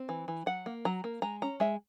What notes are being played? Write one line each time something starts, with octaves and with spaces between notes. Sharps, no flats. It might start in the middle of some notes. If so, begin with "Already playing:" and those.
Already playing: C4
E3
E3
F#3 F#5
A#3
F#3 A#5
A#3
G#3 A#5
C#4 A#5
G#3 E5